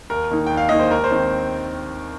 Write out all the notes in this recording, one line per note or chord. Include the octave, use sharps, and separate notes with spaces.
D#2 A#4
D#3 A#3 D#4
D#2 G5
F5
D#3 A#3 D#4 D#5
C5
D#2 A#4
C5
D#3 C4